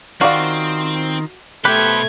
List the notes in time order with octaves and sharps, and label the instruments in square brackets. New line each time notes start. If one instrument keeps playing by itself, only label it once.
[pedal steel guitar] D#3 F4 [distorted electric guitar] C4 C5 [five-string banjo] F#4 D5 F5
[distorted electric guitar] B2 A4 [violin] A3 G#6 [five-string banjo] G4 [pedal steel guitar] B4 C5